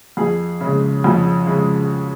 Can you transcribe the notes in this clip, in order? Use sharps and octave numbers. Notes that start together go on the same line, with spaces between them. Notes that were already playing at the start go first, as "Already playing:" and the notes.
F2 G#4
C#3 G#3
F2
C#3 G#3